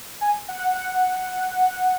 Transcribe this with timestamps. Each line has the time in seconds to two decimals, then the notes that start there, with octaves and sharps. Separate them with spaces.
0.21 G#5
0.48 F#5
0.75 F#5